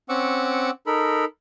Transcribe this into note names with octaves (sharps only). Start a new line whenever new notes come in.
C4 C#4 F#5 C#6 D6 E6
D#4 A4 A#4 B5